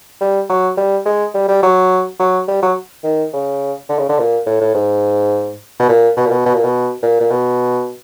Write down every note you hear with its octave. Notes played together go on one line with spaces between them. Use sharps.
G3
F#3
G3
G#3
G3
G3
F#3
F#3
G3
F#3
D#3
C#3
D3
C#3
D3
A#2
A2
A2
G#2
B2
A#2
B2
A#2
B2
B2
A#2
B2
A#2
A#2
B2